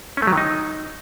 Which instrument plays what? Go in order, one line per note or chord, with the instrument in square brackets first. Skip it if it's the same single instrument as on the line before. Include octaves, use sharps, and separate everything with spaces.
[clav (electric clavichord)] C#4
A3
F#3
D#3
D#4